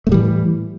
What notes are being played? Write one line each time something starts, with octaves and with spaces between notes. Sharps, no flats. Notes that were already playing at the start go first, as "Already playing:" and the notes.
A2 E3 G3 A3